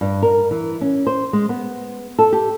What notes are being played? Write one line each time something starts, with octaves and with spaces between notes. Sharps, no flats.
G2
A#4
E3
C#4
C5
G#3
B3
A4
G4